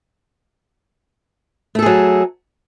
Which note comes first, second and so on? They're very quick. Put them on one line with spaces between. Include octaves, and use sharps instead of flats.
A3 A4 G#4 F#3